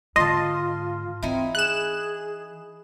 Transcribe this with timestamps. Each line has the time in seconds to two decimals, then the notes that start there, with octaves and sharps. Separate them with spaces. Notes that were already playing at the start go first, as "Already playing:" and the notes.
0.16 G#2 D3 F4 D#5 A5 C6
1.23 E3 C4 D#4 E4
1.55 G#4 F#6 E7